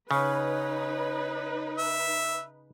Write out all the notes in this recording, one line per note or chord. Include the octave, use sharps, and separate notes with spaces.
C#3 D#4 B4 C#5
E5